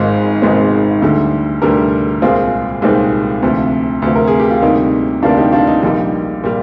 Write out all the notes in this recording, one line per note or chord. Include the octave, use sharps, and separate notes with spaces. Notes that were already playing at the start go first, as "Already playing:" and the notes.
Already playing: G#1 G#2 D#3 G#3 C4 F4 G#4
G#1 G#2 D#3 G#3 C4
D2 D3 G3
D2 D3 G3 G4 A#4
C2 A#2 G#3 C4 F4 G#4
C2 A#2 G#3 C4 D#4 G4
D2 C3 F3
D2 C3 F3
A#4
G#4
G4
F4
D2 C3 G3 A#3 D#4
D2 C3 G3 A#3 D4 F4
D#4 G4
D4 F4
D#4
A#1 A#2 G3 D#4
A#2 G3